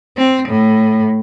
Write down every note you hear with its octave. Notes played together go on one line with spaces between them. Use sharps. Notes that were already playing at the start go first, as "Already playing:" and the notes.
C4
A2